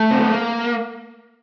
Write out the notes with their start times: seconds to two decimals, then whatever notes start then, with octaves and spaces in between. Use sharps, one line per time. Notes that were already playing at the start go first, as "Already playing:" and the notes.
Already playing: A3
0.11 C4
0.21 B3
0.31 A#3